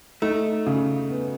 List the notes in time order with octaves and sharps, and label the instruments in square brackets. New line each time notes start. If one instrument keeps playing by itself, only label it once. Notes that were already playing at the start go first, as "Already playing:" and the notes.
[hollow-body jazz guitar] A3 [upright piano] D#4
[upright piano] C#3
B3